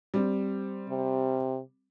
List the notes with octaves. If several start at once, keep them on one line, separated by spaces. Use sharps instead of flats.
G3 C4
C3